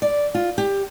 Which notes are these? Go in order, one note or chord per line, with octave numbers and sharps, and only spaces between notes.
D5
F4
G4